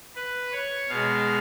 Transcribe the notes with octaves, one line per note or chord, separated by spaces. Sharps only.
B4
C#5
B2 G#3 F5